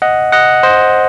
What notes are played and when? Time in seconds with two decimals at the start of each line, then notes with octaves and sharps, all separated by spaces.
0.02 D#5 F#5
0.32 D#5 F#5
0.63 C5 D#5